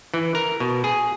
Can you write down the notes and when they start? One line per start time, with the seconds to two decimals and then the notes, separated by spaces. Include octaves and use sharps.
0.14 E3
0.35 A#4
0.60 B2
0.84 G#4